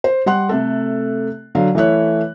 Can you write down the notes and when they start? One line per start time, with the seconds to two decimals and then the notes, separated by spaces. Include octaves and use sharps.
0.04 C5
0.26 G3 F#5 C6 F#6
0.49 C3 A3 A4
1.55 D3 F#3 F5
1.75 E3 A3 E4 C#5 F#6